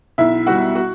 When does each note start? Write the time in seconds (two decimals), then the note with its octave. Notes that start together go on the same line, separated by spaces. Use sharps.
0.18 B1 E4 E5
0.47 B2 G3 F#4 F#5
0.75 F#4 F#5